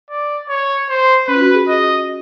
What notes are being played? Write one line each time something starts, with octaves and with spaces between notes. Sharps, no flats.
D5
C#5
C5
C#4 B4
F4
F#4
G#4
D#5